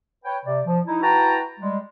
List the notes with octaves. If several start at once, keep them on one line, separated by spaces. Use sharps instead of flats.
B4 C#5 G5
C3 D5
F3
D#4 E4
E4 F#4 B4 G5 A5 A#5
G3 G#3